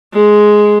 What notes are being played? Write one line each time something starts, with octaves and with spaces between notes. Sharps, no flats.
G#3